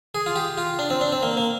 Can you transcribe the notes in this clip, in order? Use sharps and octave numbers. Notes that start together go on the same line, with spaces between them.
G#4
F4
G4
F4
D4
C4
D4
C4
A#3
A#3